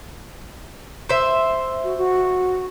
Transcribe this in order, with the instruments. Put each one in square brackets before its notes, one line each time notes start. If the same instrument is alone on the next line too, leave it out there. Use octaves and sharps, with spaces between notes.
[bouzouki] C5 E5
[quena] F#4
F#4